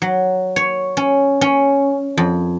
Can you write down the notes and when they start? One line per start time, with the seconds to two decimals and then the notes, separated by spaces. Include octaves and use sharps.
0.02 F#3
0.56 C#5
0.97 C#4
1.41 C#4
2.17 F2